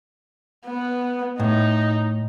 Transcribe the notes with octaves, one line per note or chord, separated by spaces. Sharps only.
B3
A2 D#4